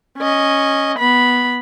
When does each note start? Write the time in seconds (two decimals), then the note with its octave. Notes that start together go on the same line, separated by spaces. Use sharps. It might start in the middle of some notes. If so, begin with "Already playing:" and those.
0.18 C#4 D#5
0.99 B3 B5